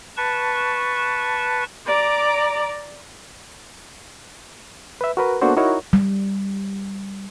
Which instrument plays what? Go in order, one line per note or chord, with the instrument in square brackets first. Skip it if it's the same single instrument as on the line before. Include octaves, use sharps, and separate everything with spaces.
[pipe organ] B4 A5 C#6
[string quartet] D5 A#5 D6
[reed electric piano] B4 E5
F#4 A#4 B4
A#3 B3 D4 F#4 A4 C5
D#4 E4 F#4 A#4 C#5
[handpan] G3